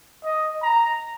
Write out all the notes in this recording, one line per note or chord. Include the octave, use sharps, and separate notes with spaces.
D#5
A#5